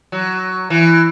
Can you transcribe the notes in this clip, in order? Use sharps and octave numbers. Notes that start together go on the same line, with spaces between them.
F#3
E3